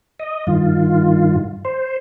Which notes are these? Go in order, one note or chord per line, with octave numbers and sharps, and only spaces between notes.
D#5
G2 D#3 F4
C5